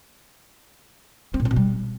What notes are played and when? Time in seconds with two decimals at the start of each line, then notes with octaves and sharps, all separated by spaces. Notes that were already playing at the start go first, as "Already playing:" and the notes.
1.34 C4
1.40 A#2
1.45 C4
1.51 B2
1.56 G3